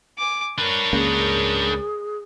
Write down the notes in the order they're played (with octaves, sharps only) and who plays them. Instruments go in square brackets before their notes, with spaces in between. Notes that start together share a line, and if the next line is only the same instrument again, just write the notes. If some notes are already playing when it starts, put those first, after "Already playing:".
[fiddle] G#5 D6
[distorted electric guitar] D4 B4 [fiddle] A#4 C#5
[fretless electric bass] C#2 A#3 C#4 [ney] G#4